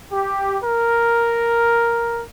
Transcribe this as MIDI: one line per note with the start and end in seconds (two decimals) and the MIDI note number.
0.11 0.58 67
0.63 2.21 70